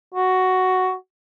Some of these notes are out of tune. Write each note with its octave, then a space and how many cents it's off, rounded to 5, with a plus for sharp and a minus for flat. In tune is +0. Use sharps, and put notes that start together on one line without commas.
F#4 +5